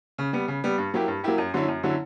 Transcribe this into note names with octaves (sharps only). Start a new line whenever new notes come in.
C#3
G3 B3
C#3
G3 B3
G2
F#3 A#3 E4 G4
G2
F#3 A#3 E4 G4
F#2
D3 F#3 C#4 E4
F#2
D3 F#3 C#4 E4